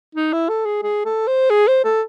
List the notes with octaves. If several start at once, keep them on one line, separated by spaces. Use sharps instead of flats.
D#4
E4
A4
G#4
G#4
A4
C5
G#4
C5
A4